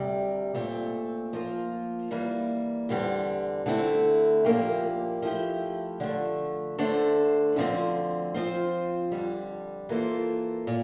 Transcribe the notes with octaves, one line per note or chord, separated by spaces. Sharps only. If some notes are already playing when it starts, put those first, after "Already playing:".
Already playing: D2 C3 G3
A#2 A3 C4
F3 A#3 F4
E3 G3 A#3
E2 D3 G3 C4
D3 A3 C4 E4
A#2 F3 A#3 E4 G4
F3 A3 E4 G4
D3 F3 A3
D3 A3 D4 A4 C5
D2 D3 F3 C4
F3 C4 F4 C5
F2 D3 G3
E3 A#3 F4 A4 C5
A#2